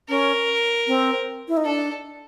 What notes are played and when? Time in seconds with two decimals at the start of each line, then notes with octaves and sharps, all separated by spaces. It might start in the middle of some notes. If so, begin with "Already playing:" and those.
0.08 C#4 A#4
0.87 C4
1.48 E4
1.57 D#4
1.65 D4 A4